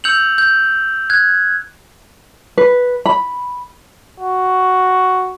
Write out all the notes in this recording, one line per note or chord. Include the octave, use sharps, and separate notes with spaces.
E6 G6 C#7 F7 F#7
G6
F#6 G#6
B4
B5
F#4